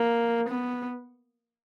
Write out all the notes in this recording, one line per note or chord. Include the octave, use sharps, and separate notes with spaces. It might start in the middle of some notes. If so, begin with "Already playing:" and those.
Already playing: A#3
B3